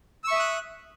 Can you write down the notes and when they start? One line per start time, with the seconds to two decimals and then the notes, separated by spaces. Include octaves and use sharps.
0.24 E6
0.28 C#6
0.32 E5
0.35 D#6
0.39 F#6